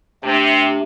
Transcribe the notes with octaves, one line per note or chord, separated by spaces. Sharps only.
C3 A3 D4 G4